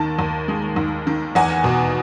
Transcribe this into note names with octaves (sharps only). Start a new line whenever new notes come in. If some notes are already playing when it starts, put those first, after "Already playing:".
Already playing: D#2 D#3 A5
D#2
G#3
D#2
D#3
E2 F#5 G#5
B2